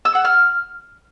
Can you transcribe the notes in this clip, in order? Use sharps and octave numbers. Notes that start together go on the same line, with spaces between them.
E6
F#5
F6